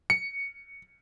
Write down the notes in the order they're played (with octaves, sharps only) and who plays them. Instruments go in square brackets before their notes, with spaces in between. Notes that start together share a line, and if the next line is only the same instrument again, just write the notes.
[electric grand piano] C#7